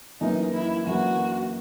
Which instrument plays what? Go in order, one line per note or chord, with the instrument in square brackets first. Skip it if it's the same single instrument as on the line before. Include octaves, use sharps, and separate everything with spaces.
[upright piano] F#2 E3 A#3 [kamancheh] D#4
[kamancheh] E4
[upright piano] F#2 E3 A#3 [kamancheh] F#4